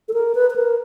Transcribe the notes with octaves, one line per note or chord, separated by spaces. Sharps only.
A4
A#4
B4
B4
A#4